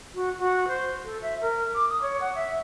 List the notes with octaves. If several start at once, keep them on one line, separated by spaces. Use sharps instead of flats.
F#4
F#4
C5
A4
E5
A#4
D6
D#6
C#5
F#5
E5